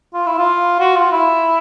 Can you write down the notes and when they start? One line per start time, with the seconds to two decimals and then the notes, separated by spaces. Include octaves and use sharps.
0.14 F4
0.27 E4
0.39 F4
0.80 F#4
0.96 F4
1.12 E4